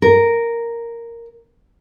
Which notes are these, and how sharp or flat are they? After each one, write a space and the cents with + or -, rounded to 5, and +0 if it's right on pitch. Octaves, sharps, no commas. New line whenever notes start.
A#4 -5